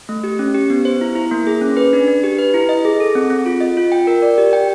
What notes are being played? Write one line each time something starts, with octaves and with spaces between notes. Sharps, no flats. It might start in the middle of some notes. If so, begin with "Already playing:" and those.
A3
G4
C#4
G4
B3
C5
E4
E4
A#3
G#4
C#4
B4
D4
D4
G4
B4
E4
D#5
G#4
A4
C4
C4
F4
D#5
F4
G5
A#4
D5
G4
G5